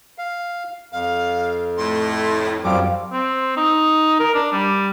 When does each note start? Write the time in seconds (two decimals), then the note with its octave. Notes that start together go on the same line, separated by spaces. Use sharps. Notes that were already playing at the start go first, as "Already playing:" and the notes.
0.18 F5
0.92 F2 F5
1.77 A2 C6
2.64 F#2 F3 G3 C4 F5 D6
3.13 C4
3.57 D#4
4.20 A#4
4.35 D4
4.52 G3